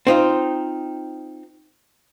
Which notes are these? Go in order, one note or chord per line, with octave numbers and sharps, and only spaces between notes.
C4 D#4 F4